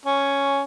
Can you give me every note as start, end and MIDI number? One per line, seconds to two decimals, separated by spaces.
0.05 0.63 61